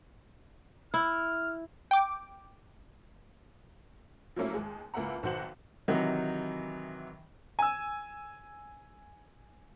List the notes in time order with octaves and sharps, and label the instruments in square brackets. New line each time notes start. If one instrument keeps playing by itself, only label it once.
[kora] E4 [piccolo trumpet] F6
[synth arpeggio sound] G5 D6
[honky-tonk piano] F3 F#3 A3 A#3 C#4 E4
D#2 G#3 G#4
C#2 A#3 E4 E5 F#5 A#5
B1 D#3 F#4 C5 F#5 F#7
[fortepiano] C3 D#3 E3 F#3 D#4
[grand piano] G#5 E6